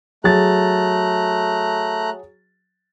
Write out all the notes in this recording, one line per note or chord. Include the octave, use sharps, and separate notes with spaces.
F#3 A3 G#4 A#5 F#6 A6